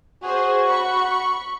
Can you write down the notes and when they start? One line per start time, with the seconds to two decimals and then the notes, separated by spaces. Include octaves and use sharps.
0.23 F#4 G#4 C5
0.68 B5 C#6